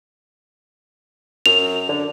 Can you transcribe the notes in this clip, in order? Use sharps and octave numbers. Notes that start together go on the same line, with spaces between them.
F#2 F7
D3